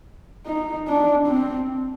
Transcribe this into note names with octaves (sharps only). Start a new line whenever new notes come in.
D#4
D4
C4